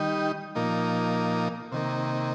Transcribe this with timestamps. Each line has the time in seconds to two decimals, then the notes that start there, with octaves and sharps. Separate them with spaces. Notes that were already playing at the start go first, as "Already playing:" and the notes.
Already playing: D#3 G3 D#4
0.55 A#2 F3 A#3 D#4
1.72 C3 D#3 A#3